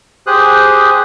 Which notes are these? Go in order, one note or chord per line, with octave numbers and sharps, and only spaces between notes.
G4 G#4 C5 D#6 F#6